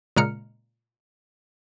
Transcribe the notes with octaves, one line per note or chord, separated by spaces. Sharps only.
A#2 C#3 G#3 A#5 F6 C#7